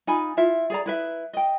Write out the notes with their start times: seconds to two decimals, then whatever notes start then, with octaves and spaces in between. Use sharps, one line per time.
0.07 D#4 F4 G#5 B5
0.37 E4 F4 E5
0.70 G#4 D5 A#5
0.86 E4 B4 E5
1.33 D#5 G5